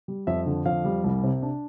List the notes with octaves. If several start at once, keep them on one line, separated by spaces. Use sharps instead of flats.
G3
F2 E5
D3
F2 F5
G3
C2
C3
D4